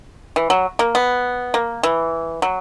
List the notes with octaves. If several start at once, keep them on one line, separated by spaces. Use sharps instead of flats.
E3
F#3
A#3
B3
A#3
E3
F#3